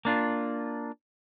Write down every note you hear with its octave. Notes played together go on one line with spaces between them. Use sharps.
A#3 D4 F4